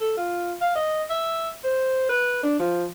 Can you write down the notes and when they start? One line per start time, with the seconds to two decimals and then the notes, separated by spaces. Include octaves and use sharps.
0.01 A4
0.17 F4
0.61 F5
0.75 D#5
1.10 E5
1.64 C5
2.09 B4
2.43 D4
2.59 F3